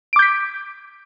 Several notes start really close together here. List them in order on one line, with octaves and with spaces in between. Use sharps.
D7 D6 G6 B6